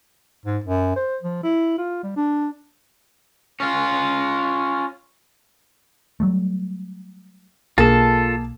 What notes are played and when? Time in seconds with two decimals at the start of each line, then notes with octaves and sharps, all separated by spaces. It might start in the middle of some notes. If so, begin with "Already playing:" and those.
0.45 G#2
0.64 F#2
0.96 C5
1.23 F3
1.43 E4
1.78 F4
2.03 G3
2.17 D4
3.60 C#4 F4
6.20 F#3 G3 A3
7.78 B1 A#3 F4 G#4 A4 A5